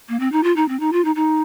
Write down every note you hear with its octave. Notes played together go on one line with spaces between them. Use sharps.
A#3
C4
D#4
F4
D#4
C4
D#4
F4
D#4
D#4